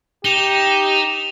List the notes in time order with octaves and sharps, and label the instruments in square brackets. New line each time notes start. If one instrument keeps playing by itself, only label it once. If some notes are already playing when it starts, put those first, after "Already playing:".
[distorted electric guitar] D#4 [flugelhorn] G4 [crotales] E7 F7 G7